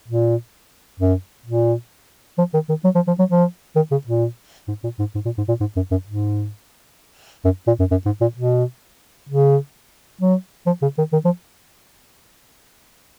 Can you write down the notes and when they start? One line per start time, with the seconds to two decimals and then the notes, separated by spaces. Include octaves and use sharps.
0.08 A#2
1.00 F#2
1.46 A#2
2.38 F3
2.54 D#3
2.69 D#3
2.84 F#3
2.95 F3
3.07 F3
3.19 F#3
3.30 F3
3.76 D#3
3.91 C#3
4.07 A#2
4.68 G#2
4.83 A#2
4.99 G#2
5.15 G#2
5.25 A#2
5.38 G#2
5.48 A#2
5.60 G#2
5.76 F#2
5.91 F#2
6.07 G#2
7.45 F#2
7.67 A#2
7.79 F#2
7.91 F#2
8.06 G#2
8.21 A#2
8.36 B2
9.29 C#3
10.21 F#3
10.66 F3
10.82 C#3
10.98 D#3
11.12 D#3
11.25 F3